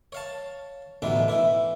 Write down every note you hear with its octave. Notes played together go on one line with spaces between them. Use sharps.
C#5 F5 A5
A1 B2 D3 E3 D#4
E3 E4